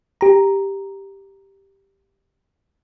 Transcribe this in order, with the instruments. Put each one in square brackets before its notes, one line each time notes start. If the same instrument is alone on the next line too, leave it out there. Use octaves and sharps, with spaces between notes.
[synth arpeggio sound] G4 A#5